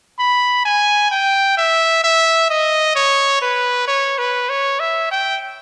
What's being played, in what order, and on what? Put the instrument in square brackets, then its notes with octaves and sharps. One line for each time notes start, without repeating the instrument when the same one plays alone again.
[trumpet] B5
G#5
G5
E5
E5
D#5
C#5
B4
C#5
B4
C#5
E5
G5